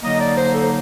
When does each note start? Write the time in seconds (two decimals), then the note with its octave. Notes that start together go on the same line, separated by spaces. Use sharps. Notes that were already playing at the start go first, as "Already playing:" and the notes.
0.03 D3 F#3 A#3 D#4 D#5
0.20 D5
0.37 C5
0.53 A4
0.62 C5